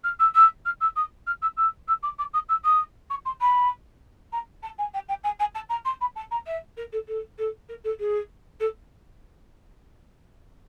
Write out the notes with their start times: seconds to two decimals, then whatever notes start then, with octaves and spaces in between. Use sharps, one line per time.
0.03 F6
0.19 E6
0.35 E6
0.65 F6
0.80 E6
0.96 D#6
1.26 F6
1.41 E6
1.57 E6
1.87 E6
2.02 D6
2.18 D6
2.33 D#6
2.48 E6
2.64 D#6
3.10 C#6
3.25 C6
3.40 B5
4.32 A#5
4.62 A5
4.78 G#5
4.93 G5
5.08 G5
5.23 G#5
5.39 G#5
5.54 A5
5.69 A#5
5.85 C6
6.00 B5
6.15 A5
6.31 A#5
6.46 E5
6.77 A#4
6.92 A4
7.07 A4
7.38 A4
7.68 A#4
7.84 A4
7.99 G#4
8.60 A4